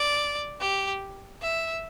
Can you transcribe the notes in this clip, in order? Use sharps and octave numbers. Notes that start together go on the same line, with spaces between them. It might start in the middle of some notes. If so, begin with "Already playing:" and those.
Already playing: D5
G4
E5